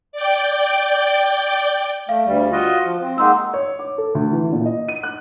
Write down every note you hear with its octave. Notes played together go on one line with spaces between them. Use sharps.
D5 G5
A3 F5
D2 G3
F4 F#4 D#5
F3
C4
G#3 A#3 D#4 F#5 C6 E6
C#5
D6
A4
D2
E3
A#2
D#5
D#7
F#6